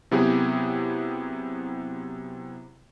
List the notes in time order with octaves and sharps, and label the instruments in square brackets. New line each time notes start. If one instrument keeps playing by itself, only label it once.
[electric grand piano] C3 F#3 B3 E4 G4 G#4